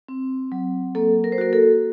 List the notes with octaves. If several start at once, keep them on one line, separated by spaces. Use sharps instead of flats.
C4
F#3
A#3 A4
A#4
C5
F#4 A#4
A4